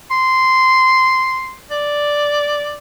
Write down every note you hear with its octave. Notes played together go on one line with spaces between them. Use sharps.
C6
D5